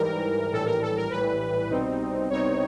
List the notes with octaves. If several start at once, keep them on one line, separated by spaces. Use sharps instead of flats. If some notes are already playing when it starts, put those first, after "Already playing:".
Already playing: G#2 E3 G3 A#4
A#1 A2 E3 G3 A4
A#4
A4
A#4
A#1 A2 E3 G3 B4
C2 B2 G3 C4 D#4
C2 B2 G3 C4 D#4 C#5